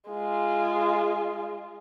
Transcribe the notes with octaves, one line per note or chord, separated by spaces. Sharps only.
G#3 F4